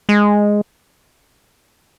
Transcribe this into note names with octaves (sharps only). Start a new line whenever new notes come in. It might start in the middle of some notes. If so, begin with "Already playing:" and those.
G#3